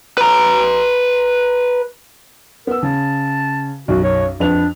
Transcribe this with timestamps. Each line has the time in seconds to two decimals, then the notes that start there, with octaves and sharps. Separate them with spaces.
0.18 B4 A#5
2.67 B3 A#4 E6
2.83 C#3 A5
3.88 B1 F#2 F#4
4.04 C#5
4.40 F2 D4 B4 F7